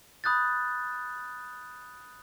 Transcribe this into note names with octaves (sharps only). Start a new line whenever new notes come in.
B5 D#6 F#6 G6 A6